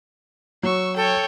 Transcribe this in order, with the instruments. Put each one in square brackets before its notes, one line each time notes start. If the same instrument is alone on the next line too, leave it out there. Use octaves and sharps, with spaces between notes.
[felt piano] F#3 [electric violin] C#6 E6
[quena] A4 [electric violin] C#5 G5